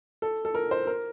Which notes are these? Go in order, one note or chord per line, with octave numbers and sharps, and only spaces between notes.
A4
A4
A#4
C5
A#4